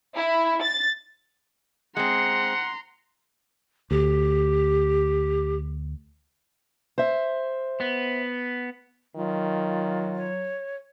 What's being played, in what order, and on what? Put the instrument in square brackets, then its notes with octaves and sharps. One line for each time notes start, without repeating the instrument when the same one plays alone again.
[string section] E4
A6
[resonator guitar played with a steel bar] G#3 C4 [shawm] F#5 [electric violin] A#5 C6
[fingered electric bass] D2 [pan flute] G4
[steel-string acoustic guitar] C5 E5
[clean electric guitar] B3
[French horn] D#3 [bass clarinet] F#3 [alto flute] F4
[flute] C#5